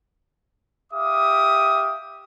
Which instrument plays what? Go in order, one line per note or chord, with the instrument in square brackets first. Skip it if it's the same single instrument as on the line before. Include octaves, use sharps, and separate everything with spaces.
[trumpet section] G4 E5 F5 D6 D#6